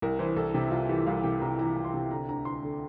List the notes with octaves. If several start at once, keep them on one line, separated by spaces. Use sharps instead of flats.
C2 A#4
E3 C5
C2 A4
C3 E4
C2 F4
E3 G4
C2 F5
C3 G5
C2 A#5
E3 A#5
C2
C6
C3
D3 A#5
D2 A#5
D2 C6
D3